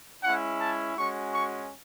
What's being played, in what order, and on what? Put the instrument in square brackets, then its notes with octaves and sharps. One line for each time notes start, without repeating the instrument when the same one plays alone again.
[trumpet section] G#3 C#4 E4 F#5
A5
G#3 C#4 F#4 C#6
C#6